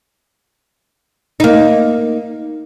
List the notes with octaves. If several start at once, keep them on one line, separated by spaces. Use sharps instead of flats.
A#3 D#4